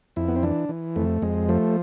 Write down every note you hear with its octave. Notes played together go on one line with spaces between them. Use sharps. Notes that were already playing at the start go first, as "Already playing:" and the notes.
F2 E4
B3
C4
E3 D4
E3
F2 A3
F2 G#3
F3 A3